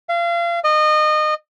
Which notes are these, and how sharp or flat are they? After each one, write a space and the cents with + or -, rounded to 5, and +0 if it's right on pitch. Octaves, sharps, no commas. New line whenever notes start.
F5 -30
D#5 -25